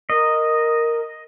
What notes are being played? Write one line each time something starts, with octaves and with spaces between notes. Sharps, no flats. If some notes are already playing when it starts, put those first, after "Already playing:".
A#4 D#5